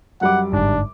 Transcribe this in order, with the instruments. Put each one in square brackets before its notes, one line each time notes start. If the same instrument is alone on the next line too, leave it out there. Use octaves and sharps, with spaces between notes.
[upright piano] F#2 G3 D6 [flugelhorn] F#5
[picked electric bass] G1 G#2 [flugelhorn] D4